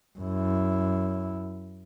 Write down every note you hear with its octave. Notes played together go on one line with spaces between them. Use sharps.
F#2 E4